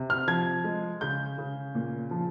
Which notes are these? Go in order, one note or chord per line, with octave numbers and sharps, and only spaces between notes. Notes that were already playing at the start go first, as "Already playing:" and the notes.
Already playing: C3
F6
F3 G#6
G#3
C#3 G6
C#3
A#2
F3